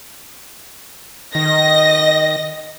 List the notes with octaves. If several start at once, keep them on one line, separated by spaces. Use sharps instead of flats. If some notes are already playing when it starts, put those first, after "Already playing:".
D#3 D#5 A#6